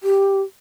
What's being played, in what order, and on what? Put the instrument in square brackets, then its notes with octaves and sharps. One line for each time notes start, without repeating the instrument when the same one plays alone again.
[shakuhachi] G4